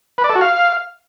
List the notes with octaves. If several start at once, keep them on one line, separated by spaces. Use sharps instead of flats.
B4
D5
A4
F#4
F5